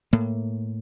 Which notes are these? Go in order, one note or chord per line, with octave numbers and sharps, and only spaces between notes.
A2 A#3